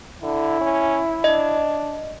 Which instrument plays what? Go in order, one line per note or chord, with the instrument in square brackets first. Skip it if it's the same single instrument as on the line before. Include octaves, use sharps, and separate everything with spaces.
[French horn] D3 [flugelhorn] E4
[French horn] C#4
[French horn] D4 [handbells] D#5